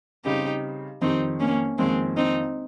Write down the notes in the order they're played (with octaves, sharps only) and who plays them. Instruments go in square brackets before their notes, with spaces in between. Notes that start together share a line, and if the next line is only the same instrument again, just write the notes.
[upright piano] C#3 G3 C4 [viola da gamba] D#4 G4
[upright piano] F2 D#3 G3 [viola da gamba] C4 D#4
[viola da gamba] A#3 C#4
[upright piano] F2 D#3 A#3 [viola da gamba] G#3 C4
[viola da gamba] C4 D#4